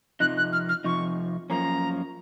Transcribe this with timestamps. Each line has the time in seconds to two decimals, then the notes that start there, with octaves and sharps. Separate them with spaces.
0.20 F2 C3 F3 D#4 F#6
0.37 F#6
0.52 F6
0.68 F6
0.84 F2 C3 F3 D#4 C#6
1.50 F#2 F3 A#3 C#4 A#5